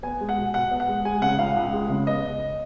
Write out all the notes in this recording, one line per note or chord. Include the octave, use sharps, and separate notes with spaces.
B3 G#5
G#3
F#5
B2
B2 F#5
B3
F#5
G#3
G#3 G#5
C#3 F#5
C#2 F5
C#2
G#3
C#3
B3 D#5